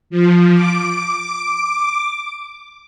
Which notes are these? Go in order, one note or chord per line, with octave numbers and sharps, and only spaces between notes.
F3
D6